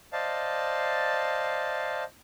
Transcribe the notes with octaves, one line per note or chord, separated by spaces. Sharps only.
C5 D5 D#5 F5 A5